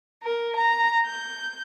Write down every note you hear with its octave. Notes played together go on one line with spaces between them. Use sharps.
A#4
A#5
G6